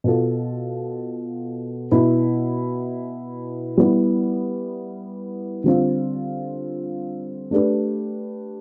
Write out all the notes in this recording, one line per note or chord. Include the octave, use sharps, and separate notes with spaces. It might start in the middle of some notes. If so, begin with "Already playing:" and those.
B2 B3 F4 A4
B2 B3 E4
G3 B3 E4
D3 G3 C4 F4
A3 D4 G4 B4